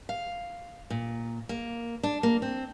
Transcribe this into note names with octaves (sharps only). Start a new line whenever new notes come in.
F5
A#2
A#3
D4
A#3
C4